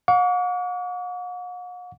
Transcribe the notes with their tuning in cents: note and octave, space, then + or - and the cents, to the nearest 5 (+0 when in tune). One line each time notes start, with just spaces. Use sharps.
F#5 -45 C#6 +45